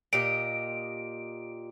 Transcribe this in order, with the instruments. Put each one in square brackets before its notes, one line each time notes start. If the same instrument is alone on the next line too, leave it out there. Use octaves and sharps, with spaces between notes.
[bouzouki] A#2 G4 D#5 [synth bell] D7